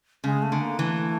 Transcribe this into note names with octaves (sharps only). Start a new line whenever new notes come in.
C#3 G#3
A3
D3
A#3
E3 A3